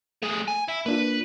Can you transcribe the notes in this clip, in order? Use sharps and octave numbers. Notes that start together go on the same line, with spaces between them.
A3 G#4
G#5
E4
A#3 D4 F4 B4